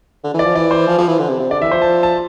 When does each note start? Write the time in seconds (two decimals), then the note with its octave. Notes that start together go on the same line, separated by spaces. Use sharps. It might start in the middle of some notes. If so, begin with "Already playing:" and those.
0.24 D3
0.34 E3
0.39 D5
0.45 F3
0.55 E3 D5
0.71 C5
0.87 F3
0.98 F3
1.08 E3
1.19 D3
1.29 C3
1.40 C3
1.51 D3 D5
1.61 E3 E5
1.71 F3 C5
1.82 A5
2.03 A5